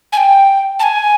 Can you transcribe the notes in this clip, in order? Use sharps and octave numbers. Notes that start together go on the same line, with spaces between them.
G#5
G5
A5
G#5